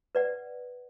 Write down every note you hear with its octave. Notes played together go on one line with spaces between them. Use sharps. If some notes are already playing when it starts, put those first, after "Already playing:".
B4 D5 F#5